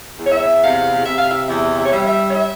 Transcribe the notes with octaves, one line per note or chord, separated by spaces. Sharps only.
E2
C#5
E5
C3 F5
C3 E5
F5
E5
E2 E5
E5
C#5
G3 E5
E5
C#5
E5